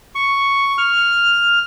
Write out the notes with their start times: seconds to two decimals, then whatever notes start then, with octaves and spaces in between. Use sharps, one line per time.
0.15 C#6
0.78 F6